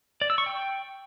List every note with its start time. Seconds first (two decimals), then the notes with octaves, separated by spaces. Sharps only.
0.22 D5
0.30 E6
0.38 C#6
0.46 G5